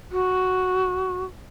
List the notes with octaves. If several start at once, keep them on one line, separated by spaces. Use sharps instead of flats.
F#4